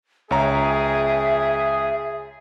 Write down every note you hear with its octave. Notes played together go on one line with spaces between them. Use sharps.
C#2 G#4 C#5 E5 A#5